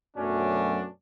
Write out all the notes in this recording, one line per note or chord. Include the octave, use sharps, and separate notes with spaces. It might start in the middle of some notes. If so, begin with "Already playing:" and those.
F#2 B2 F#3 A3 C#4 D4